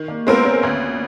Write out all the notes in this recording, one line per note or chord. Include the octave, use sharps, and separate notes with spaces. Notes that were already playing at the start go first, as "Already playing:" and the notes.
Already playing: D#3
A#3
G#3 B3 C4 F4 A#4
C#4
D2